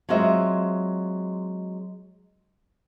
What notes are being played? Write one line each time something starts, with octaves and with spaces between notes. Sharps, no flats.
F#3 G#3 C4 F4 D#5 E5